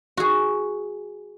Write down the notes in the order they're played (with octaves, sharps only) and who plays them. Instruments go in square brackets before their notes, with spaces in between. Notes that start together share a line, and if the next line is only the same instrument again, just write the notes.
[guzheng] F#4 G#4